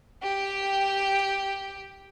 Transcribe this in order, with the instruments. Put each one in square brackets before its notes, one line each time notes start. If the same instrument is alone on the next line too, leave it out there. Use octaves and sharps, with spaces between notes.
[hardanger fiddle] G4 G5